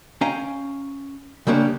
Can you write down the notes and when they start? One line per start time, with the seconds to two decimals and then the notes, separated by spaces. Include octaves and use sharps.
0.21 C#4 F5 G5 G#5 A#5
1.47 C#3 G3 A#3 C#4 D4